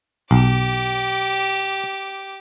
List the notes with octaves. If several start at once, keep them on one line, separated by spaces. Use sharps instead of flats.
B1 G4 D6